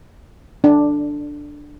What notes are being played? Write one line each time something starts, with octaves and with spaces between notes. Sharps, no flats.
D4